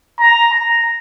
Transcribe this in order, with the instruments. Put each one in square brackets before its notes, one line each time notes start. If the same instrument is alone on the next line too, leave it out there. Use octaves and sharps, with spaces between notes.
[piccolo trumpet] A#5
A#5